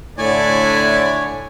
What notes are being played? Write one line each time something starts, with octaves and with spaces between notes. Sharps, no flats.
A2 D3 E4 C#5 D5 G#5